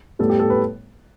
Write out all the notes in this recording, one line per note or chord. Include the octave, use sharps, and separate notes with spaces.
A2 G3 B3 A4
G4
A4
B4